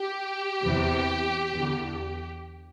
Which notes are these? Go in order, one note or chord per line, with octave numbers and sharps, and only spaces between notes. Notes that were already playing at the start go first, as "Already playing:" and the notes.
Already playing: G4
E2 C3 E3
E2 D3